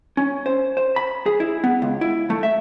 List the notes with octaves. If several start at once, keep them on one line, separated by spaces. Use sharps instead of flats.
C#4
C5
C5
B5
G#4
E4
B3
C#2
E4
A3
E5